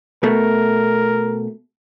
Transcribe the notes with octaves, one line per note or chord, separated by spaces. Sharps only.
B2 A3 A#4